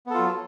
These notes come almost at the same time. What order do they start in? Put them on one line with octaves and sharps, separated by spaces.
B3 A4 F4 F#3